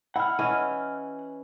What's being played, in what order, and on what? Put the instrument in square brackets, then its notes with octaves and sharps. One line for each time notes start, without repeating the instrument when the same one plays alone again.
[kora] E4 [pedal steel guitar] F#5 F6
[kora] E3 C#4 D#5